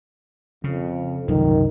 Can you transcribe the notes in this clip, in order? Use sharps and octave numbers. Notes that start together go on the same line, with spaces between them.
F2 C#3
C2 F#2 D#3 F3